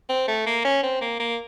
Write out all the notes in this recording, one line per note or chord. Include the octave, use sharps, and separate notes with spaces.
C4
A3
A#3
C#4
C4
A#3
A#3